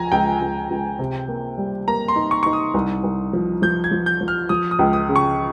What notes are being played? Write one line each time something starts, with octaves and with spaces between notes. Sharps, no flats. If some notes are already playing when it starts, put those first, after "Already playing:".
Already playing: C#2 F3 G#5 A#5
C#2 G5
C#2
C#2
C3
A#3
G3
A#3 A#5
C6
D#4
C#6
D#4 C#6
D#6
C2
C2
F3
F3 G6
G#6
F3
G6
F3
F6
F3 D#6
D#6
C#2
D#6
C#3
C#6